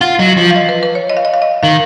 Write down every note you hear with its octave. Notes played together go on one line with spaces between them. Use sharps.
F4 F#5
F#3 D#5
F5
F3
F5
D#5
B4
B4
C#5
D#5
F5
D#5
F5
D#5
D#3 F5